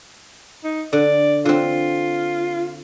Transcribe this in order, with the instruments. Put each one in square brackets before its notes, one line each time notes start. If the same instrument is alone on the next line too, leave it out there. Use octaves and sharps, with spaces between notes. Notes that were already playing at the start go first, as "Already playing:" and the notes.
[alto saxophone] D#4
[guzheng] D3 [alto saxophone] D5
[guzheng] D3 C4 [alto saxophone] F4